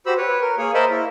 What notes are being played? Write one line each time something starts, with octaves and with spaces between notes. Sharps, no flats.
F#4 G4 C5 B5 E6
B4 C#5
A#4
A#3 G#4 C#5
A#4 C5 D#5 E5 A5 B5
A#3 E4